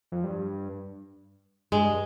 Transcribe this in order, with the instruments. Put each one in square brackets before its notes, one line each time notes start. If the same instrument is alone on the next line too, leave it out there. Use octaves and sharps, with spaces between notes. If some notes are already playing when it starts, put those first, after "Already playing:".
[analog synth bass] F2
G2
[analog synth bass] G2 [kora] G#3